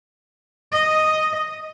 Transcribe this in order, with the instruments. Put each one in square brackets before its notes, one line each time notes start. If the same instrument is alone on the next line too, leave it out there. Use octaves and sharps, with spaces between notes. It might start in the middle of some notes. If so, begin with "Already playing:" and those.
[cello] D#5